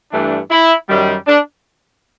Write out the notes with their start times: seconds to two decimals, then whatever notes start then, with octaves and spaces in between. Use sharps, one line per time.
0.12 G2 E3 A3 D4
0.50 E4
0.88 F#2 D#3 G3
1.27 D4